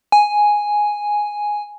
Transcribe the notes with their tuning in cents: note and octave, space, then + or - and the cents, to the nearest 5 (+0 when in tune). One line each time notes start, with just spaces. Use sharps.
G#5 +0